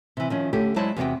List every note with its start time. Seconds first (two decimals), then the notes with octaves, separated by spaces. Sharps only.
0.17 C3 E3
0.30 D#3 F3 C#4
0.53 D3 A3 C#4 G4
0.76 F#3 G#3 E4 C5 D5 A5
0.97 E2 C3 B3 F#4 G5